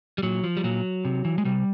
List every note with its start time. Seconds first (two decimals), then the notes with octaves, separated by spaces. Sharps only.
0.18 G3
0.23 A#2 F#3
0.44 F3
0.57 G3
0.64 A#2 F#3
1.05 C3
1.25 E3
1.38 G#3
1.45 C3 G3